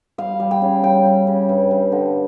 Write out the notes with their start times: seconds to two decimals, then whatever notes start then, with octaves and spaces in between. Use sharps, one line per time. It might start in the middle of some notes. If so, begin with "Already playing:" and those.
0.18 G3 F5
0.40 G3
0.51 G5
0.62 C#3
0.83 G3 G5
1.05 G3
1.27 C#3
1.49 G2
1.71 G2
1.92 D3